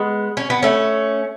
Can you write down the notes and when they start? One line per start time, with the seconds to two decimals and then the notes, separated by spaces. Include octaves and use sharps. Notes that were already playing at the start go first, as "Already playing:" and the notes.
Already playing: G#3 B3
0.37 C#4
0.50 B3
0.63 A3 C#4